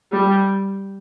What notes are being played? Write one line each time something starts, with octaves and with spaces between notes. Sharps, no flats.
G3